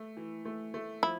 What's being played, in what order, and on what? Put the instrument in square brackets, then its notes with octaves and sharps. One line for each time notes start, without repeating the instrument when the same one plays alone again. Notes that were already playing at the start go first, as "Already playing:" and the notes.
Already playing: [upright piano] A3
E3
A3
A3
[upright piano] F3 [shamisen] E4